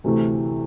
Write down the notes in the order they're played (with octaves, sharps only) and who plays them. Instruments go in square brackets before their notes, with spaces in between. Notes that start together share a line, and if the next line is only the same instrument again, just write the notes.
[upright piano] D2 C3 E3 A3